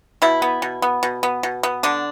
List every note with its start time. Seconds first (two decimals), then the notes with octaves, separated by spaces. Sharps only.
0.22 B2 E4
0.42 B3
0.62 B2
0.82 B3
1.03 B2
1.23 B3
1.43 B2
1.63 B3
1.83 D3 D4